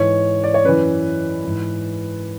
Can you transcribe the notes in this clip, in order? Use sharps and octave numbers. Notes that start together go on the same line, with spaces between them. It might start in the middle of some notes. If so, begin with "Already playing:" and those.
Already playing: G#2 E3 C#5
D5
C#5
F#2 E3 B4
G#2 E3